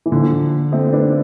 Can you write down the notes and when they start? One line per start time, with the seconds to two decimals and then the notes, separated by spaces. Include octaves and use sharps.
0.06 E3
0.12 D3 F3
0.72 A3 C4
0.93 B3 D4